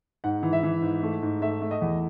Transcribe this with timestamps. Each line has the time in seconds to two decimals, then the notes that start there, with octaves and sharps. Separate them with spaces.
0.24 G#2 F#5
0.43 E3
0.53 E5
0.63 E3
0.82 G#2
1.03 A3
1.22 G#2
1.42 A3 E5
1.62 A3
1.71 D#5
1.82 E2